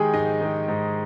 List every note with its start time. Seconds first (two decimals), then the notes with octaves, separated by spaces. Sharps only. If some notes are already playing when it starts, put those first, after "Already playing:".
Already playing: D#3 G#3 G4 G#4 G5 G#5
0.13 G#2 D#4 D#5
0.41 D#3 G#3
0.68 G#2